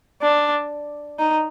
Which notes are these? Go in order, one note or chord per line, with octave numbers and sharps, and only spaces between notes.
D4
D#4